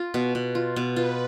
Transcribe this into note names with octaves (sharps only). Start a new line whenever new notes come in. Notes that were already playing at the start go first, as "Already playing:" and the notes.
Already playing: F4
B2
B2
F4
B2
F4 B4